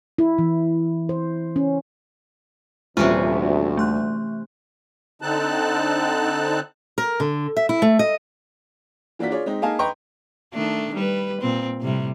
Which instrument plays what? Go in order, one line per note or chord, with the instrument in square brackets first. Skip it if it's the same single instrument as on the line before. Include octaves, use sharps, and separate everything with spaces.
[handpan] E4
E3
C5
C#4
[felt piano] D#1 [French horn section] D2 [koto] C3 E3 C#4 [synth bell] F4
[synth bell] A3 C6 F#6
[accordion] D3 C4 D#4 A5 F#6
[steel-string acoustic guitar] A#4
D3
E5
E4
A3
D#5
[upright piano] E3 A#3 D4 F4 F#4 B6
F4 G#4 C#5 D5
G#3 C4 D#4
A#3 D#4 G#4 F5 G#5 A5
B4 D#5 G5 A#5 C6 C#6
[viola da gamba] D#3 A3 D4
G3 B4
A#2 C4
A2 C3 G3